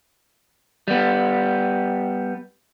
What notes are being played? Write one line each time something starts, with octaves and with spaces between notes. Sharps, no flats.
G3 B3